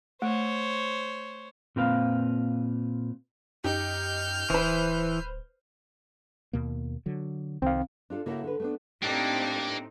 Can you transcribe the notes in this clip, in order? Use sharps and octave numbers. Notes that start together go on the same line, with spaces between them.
A3 C5 C#5
A#2 C4 B4 F5
F#2 D#4 G4 F6 G6
D1 E3 B4 C5
D#2 B2 A#3
D3 F#3
C2 D#3 C4 F5
D4 F4 A4
C#3 A#3 E4 F#4 A4
D3 B4
A3 B3 D4
A2 A#3 C4 D4 D#4 G4